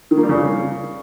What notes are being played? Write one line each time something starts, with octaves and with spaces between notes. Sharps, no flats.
D#3
A#3
G3
C#3